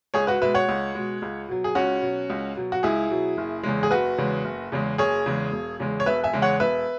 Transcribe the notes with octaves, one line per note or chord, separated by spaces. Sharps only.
C#2 G#4 C#5
F#4 B4
B2 G#3 B4 E5
C#5 F#5
C#2
B2 G#3
C#2
B2 F#3
G#4
C#2 C#4 F#4
B2 F#3
C#2
B2 F#3
F#4
C#2 E4 G#4
B2 F#3
F#1
E2 C#3 G#3
G#4
F#1 F#4 B4
E2 C#3 G#3
F#1
E2 C#3 G#3
F#1 G#4 C#5
E2 C#3 G#3
E1
E2 C#3 G#3
C#5
E1 B4 E5
E5 G#5
E2 C#3 G#3
C#5 F#5
E1 B4 E5